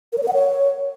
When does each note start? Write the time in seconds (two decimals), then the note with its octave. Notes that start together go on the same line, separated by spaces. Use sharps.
0.13 A#4
0.18 C#5
0.23 A#4
0.28 F#5
0.33 C#5